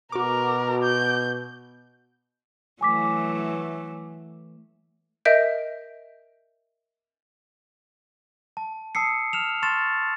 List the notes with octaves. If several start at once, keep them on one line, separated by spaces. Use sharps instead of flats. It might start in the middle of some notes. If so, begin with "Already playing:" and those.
B2 F#4 A#4 D6
G6
E3 F#3 A3 G#5 D6 B6
A#4 D#5 E5 G6 D7
A5
A5 D#6 E6 C7 C#7
F6 E7 F7
A5 C6 C#6 F6 A6 E7